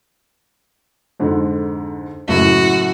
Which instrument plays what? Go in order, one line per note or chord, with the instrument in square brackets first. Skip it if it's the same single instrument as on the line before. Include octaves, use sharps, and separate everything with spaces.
[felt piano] F2 G#2 D3
[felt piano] F#1 F#2 A2 [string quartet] F#4